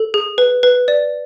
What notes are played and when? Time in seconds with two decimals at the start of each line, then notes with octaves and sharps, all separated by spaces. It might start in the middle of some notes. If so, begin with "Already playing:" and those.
Already playing: A4
0.14 G#4
0.38 B4
0.63 B4
0.88 D5